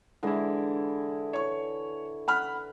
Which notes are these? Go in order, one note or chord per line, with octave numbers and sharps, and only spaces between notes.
D3 E3 G#3 E4
C#5 C#6
F#5 B5 F6